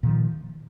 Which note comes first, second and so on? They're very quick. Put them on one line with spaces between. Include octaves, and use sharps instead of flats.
A#2 D#3 F3